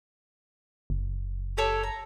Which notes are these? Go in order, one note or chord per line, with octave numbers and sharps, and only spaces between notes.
F#1
G4 A4 C#5
A#5